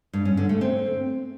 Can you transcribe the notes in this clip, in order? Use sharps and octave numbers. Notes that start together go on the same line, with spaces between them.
G2
C#4
D3
A3
C4